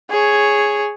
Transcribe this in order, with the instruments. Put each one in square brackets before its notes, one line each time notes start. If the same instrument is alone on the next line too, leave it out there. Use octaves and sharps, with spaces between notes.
[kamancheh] G#4 C#5